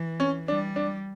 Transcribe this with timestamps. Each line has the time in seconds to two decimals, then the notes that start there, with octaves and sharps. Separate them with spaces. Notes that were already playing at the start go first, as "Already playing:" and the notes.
Already playing: E3
0.20 C#4
0.48 G3 D4
0.76 D4